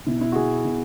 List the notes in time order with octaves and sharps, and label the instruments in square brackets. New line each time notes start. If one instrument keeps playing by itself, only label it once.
[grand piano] B2 E4
E4
F#4
B2 G#4
B2